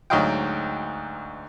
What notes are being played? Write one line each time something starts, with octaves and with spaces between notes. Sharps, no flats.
D2 G#2 F#3 D#5 F5 G5